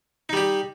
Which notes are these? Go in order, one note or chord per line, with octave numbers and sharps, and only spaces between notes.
G3 D#4 G4